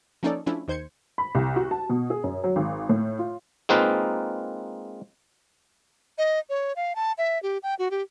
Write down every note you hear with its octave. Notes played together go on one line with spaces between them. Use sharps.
F3 A#3 C#4 D#4 A4 D5
F3 A3 C#4 D4 E4
D#2 D#3 C5 G6 G#6 C#7
B5
C2
F#4
A5
B2
G#4
F#2
F#3
G#1
A2
F4
G#3 A#3 C4 D#4 F4 B4
D#5
C#5
F5
A5
E5
G4
G5
F#4
G4